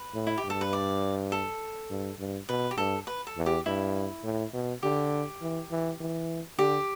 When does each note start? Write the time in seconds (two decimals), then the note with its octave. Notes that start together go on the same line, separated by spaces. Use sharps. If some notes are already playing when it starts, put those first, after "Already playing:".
Already playing: B4
0.14 A2
0.27 E4
0.38 G4
0.44 G2
0.50 A4
0.61 B4
0.73 D5
1.32 A4
1.90 G2
2.19 G2
2.49 B2 B4
2.71 G4
2.77 G2 A4
3.07 B4
3.27 A4
3.37 E2
3.46 G4
3.66 G2 E4
4.24 A2
4.53 B2
4.83 D3 G4
5.41 E3
5.71 E3
6.00 E3
6.58 D3 G4